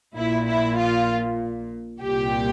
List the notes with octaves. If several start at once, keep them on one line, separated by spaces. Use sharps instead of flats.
A#1 A#2 E4
E4
F4
C2 A#2 G4